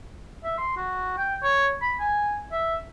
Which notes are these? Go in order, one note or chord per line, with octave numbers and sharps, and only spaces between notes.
E5
C6
F#4
G5
C#5
B5
G#5
E5